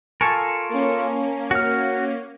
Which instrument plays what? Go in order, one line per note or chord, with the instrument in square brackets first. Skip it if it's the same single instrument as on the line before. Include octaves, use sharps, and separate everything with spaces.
[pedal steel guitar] F4 A4 A#4 [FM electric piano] G#5 A5 C#6
[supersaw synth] A#3 C#4
[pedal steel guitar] F#4 F6